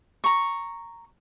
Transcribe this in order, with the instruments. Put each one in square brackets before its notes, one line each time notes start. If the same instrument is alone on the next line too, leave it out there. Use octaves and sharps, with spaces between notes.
[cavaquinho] A#5 C#6